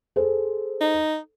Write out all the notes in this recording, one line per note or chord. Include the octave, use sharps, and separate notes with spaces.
G#4 A4 C5
D#4